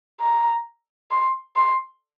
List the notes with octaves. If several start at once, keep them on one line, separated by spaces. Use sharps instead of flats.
A#5
C6
C6